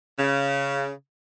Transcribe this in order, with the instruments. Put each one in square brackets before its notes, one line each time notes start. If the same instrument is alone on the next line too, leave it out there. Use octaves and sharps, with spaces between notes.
[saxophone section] C#3